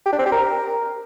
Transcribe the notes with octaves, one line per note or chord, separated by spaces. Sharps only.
G4
D4
C4
G4
A#4